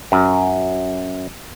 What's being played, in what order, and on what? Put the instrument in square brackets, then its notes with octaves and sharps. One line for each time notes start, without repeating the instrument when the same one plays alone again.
[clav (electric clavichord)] F#2